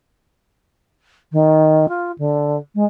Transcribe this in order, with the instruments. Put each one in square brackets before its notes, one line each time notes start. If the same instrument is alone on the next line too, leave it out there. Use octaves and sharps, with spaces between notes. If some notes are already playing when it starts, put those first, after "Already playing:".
[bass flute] D#3
F4
D3
G#3